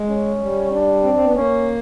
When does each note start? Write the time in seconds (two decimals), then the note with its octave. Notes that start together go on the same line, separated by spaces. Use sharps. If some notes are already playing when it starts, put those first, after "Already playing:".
Already playing: G#3
0.09 C#4
0.36 G#3
0.41 G3
0.72 D4
1.03 C4
1.14 C4
1.24 B3
1.35 A#3 C#4